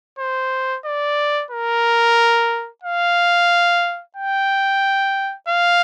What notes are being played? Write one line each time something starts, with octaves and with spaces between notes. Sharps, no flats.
C5
D5
A#4
F5
G5
F5